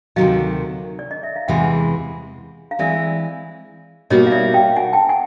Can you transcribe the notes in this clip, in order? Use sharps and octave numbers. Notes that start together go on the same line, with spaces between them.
D2 C3 D#3 F#3 D#5 F5
D5
D#5
E5
F5
E2 C3 E3 G#3 E5 F#5
F5
E3 G#3 C4 D5 E5
B2 G3 A#3 D#4 F#4 C#5 D#5
F5
D5 E5
F5 G5
F#5 G#5
G5 A5
F#5 G#5